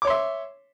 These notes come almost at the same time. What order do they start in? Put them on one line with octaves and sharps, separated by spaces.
D6 C#5 C6 E5